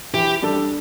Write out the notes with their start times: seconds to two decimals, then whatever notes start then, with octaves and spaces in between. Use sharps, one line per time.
0.14 E3 G4
0.42 G3 D4 A4